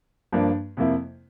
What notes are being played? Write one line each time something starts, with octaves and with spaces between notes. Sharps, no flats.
G2 F3 A#3 D4
F2 C3 F3 A#3 E4